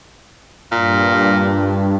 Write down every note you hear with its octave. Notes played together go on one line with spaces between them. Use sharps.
G2 A#2